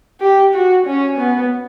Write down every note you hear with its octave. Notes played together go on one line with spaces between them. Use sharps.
G4
F#4
C#4
B3